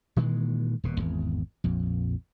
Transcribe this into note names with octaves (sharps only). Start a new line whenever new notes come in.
A#2 D#3 E3 G#3
D#1 B2
G#1 E2
A#1 F2